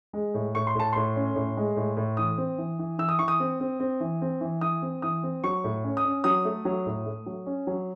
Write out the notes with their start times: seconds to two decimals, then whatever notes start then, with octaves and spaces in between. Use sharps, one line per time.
0.13 G#3
0.34 A2
0.55 A2 C#6
0.67 C6
0.75 A2 A5
0.93 A2 C6
1.16 C#4
1.36 A2
1.57 G#3
1.76 A2
1.97 A2
2.17 E3 D#6
2.38 C4
2.58 E3
2.79 E3
2.98 E3 E6
3.09 D#6
3.19 E3 C#6
3.28 D#6
3.40 C4
3.60 C4
3.80 C4
4.00 E3
4.22 C4
4.41 E3
4.61 E3 D#6
4.82 C4
5.02 E3 D#6
5.23 C4
5.44 F#3 C#6
5.64 A2
5.84 C#4
5.97 D#6
6.05 C#4
6.24 F#3 D#6
6.45 A3
6.65 F#3
6.86 A2
7.06 A3
7.26 F#3
7.46 C#4
7.67 F#3